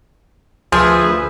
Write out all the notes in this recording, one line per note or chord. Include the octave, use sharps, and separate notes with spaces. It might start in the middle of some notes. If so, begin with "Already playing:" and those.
D2 F3 G#4 B4 E5